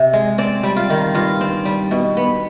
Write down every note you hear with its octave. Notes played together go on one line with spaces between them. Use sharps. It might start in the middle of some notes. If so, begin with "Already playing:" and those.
Already playing: C3
G#3
C4 D5
G3
F4
D#3
G2 F4
C4
G3
B2
B3